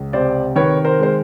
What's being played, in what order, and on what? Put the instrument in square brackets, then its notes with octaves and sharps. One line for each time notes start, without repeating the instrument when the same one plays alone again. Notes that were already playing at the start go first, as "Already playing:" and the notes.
Already playing: [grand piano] C#2
C3 C5 D5
D#3 B4 C#5
A#4 C5
G#3 C5